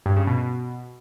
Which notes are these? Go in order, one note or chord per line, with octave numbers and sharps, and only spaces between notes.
G2
C#3
B2
B2